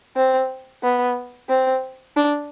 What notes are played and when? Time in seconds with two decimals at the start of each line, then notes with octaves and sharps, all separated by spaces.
0.16 C4
0.83 B3
1.49 C4
2.17 D4